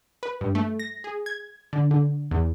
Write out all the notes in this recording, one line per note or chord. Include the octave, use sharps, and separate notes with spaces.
B4
G2
A3
A#6
G#4
G#6
D3
D3
E2